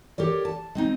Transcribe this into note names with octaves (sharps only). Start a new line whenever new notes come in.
G4 A#4 C#5 D5
A5
G#3 C4 D#4